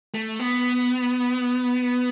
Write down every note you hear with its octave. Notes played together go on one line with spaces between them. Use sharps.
A3
B3